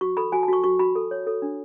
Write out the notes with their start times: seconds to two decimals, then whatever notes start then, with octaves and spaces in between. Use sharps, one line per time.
0.01 F#4 C#6
0.17 A4 B5
0.32 F#4 G#5
0.43 A5
0.48 F#4 C#6
0.64 F#4 C#6
0.79 F#4 B5
0.96 A4
1.11 C#5
1.27 A4
1.42 D4